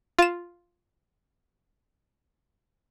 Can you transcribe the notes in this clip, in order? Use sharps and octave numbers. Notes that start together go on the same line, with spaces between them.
F4 E7